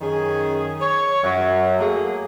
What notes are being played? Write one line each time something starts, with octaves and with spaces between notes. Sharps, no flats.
F#2 D#3 C#4 G#4
C#5
F#2 F#3
A3 A#3 G#4